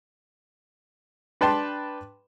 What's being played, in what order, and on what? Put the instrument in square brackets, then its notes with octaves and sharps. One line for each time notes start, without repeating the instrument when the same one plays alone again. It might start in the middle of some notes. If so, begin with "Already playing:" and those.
[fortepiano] D4 B4 G5 A5 B5 C6